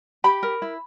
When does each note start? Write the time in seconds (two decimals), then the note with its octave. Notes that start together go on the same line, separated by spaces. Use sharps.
0.24 G4 B5
0.43 A#4
0.62 E4